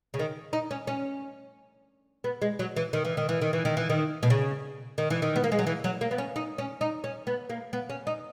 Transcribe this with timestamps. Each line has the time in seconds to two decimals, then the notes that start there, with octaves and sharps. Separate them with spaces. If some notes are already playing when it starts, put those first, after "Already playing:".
0.14 C#3
0.19 D#3
0.53 D#4
0.71 C#4
0.87 C#4
2.24 B3
2.42 G#3
2.59 F#3
2.76 E3
2.93 D#3
3.05 E3
3.17 D#3
3.29 E3
3.42 D#3
3.53 E3
3.65 D#3
3.77 E3
3.90 D#3
4.23 B2
4.30 C#3
4.98 D#3
5.10 E3
5.22 D#3
5.36 B3
5.44 A#3
5.52 G#3
5.59 F#3
5.67 E3
5.84 F#3
6.01 A#3
6.11 B3
6.18 C#4
6.36 D#4
6.58 C#4
6.81 D#4
7.04 C#4
7.27 B3
7.50 A#3
7.73 B3
7.90 C#4
8.07 D#4